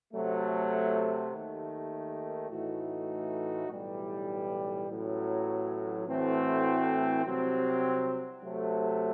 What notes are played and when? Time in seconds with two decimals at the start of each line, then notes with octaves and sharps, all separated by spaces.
0.13 C3 F#3 A3
1.31 D#2 D#3 A3
2.49 A2 E3 A3 D#4 F#4
3.68 B1 A2 E3 G3
4.87 A1 A2 F#3
6.05 A2 E3 A3 C4 F#4
7.24 C2 C3 F#3 C4
8.43 C3 F#3 A3